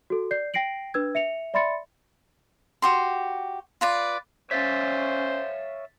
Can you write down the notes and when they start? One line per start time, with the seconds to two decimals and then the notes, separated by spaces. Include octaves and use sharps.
0.10 F#4 A4
0.31 D5 G6 C7
0.54 G5 A#6 C7 D7 F#7
0.94 D4 B4 E6 G#6
1.15 E5 C#7 F7
1.54 D5 E5 B5 C6 A6 C#7
2.82 F#4 G4 C6
3.81 F4 B4 D5
4.51 C#4 C5 C#5 E5 F5 A6 B6